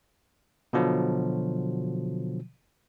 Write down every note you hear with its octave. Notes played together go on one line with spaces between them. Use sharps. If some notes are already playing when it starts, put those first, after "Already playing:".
B2 D3 F3 F#3